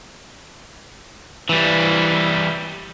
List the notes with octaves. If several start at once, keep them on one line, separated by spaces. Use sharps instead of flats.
E3 G3